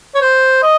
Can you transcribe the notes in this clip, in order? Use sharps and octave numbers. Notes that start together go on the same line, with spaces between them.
C#5
C5
D#5